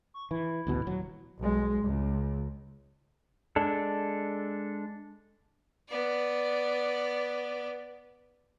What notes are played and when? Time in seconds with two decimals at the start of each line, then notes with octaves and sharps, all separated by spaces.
0.14 C#6
0.31 E3 E4
0.67 A1 D2 B2
0.86 D#1 F#3
1.38 B1 G#3
1.82 C#2
3.56 G#3 D4 A4
5.89 B3 D5